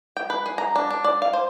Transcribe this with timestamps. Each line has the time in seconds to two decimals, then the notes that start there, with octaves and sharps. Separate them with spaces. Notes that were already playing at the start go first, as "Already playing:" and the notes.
0.17 G5
0.30 B4
0.46 G#4
0.58 A#5
0.76 D4
0.90 D4
1.04 D5
1.22 F5
1.33 C5